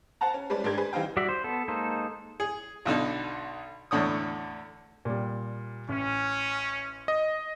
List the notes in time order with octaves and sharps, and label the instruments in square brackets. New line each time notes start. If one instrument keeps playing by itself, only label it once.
[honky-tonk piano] C5 F#5 A5 A#5
C#4
G3 G#3 C#4 B4 C5 D5
G#2 D4 G4 A4 A#4 G#6
G#4 B4 C5
E3 G3 D#4 C5 F5 G5
[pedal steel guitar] G3 F#4 D5 E5
C5
B3 A4
G#3 A#3 D#4 A4 C5
[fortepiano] G#4
B1 B2 D3 D#4
E2 A2 D3 C#5 D#6
[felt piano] A#2 G3
[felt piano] A1 [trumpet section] C#4
[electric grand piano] D#5